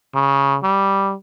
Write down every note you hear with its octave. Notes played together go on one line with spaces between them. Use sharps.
C#3
G3